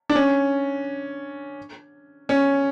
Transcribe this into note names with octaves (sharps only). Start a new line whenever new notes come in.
D4
C#4
C#4